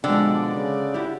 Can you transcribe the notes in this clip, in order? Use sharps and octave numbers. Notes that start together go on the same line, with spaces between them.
B2 D3 F3 G#3 D5 G5
C#3
E4 F#4 G4